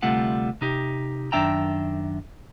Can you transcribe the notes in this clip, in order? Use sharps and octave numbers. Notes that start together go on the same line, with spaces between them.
D2 C3 G3 A3 F4 F#5
C3 D#4 G4
F#2 D#3 D4 E5 G5 A#5